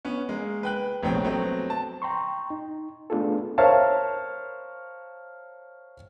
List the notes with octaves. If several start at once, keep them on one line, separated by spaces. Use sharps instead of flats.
B3 C#4
G#3 A#3
B4 G5 F#6
F1 A#1 B3 C4 C#5 G5
F#3 A3 B3 C4
A5
G5 A#5 C6 C#6
D#4
A3 B3 D4 F4 G#4 A4
A#4 C5 C#5 E5 F5 A5